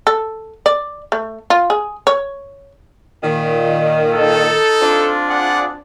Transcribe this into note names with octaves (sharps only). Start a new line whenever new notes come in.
A4
D5
A3
F4
G#4
C#5
A#2 D#3
D#4 A4
C4 D4 F4
G#4 D5 F#5